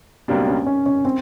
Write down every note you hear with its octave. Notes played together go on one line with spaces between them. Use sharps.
C#2 B2 G3 A#3 C4 D4
C#4
C#4
C#4
C4